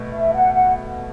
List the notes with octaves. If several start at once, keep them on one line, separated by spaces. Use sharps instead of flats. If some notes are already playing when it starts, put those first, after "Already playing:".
Already playing: B2 A3
E5
F#5
F#5